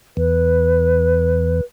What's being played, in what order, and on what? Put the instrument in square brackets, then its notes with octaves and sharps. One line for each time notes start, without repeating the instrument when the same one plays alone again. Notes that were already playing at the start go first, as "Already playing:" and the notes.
[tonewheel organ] E2 [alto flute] B4